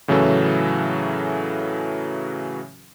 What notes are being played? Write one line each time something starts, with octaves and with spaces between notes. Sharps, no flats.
A2 C#3 E3 F#3 C#4 A4